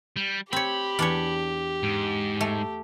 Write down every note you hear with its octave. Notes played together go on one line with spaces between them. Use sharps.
G3
C4 G4 C#5 B5
E2 D4 C#5
G#2
A3